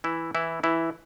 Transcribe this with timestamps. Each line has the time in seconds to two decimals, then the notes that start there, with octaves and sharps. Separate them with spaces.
0.04 E3 E4
0.35 E3 E4
0.63 E3 E4